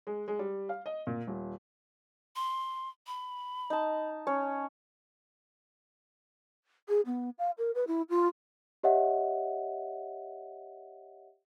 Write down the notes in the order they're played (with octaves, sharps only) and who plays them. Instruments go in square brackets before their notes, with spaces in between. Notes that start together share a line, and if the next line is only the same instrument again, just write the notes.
[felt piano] G#3
G#3
G3
F5
D#5
A#2
D#1
[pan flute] C6
B5
[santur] D#4 A5
C#4 C#5
[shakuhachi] G#4
B3
F5
A#4
B4
E4
F4
[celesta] G4 C#5 D#5 E5 F#5